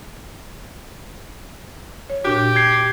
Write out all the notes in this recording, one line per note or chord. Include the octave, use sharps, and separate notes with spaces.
C#5
A#2 D4 F#4 G4
G#6 C7